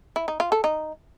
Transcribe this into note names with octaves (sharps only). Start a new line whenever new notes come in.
E4
D#4
F4
A4
D#4